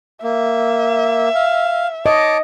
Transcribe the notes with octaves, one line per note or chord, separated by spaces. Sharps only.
A#3 E5
F5
C#5 D#5 A5 D6